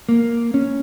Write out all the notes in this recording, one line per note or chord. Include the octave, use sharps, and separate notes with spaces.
A#3
C#4